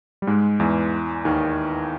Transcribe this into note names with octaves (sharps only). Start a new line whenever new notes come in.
G3
G#2 G#3
E2 E3
D#2 D#3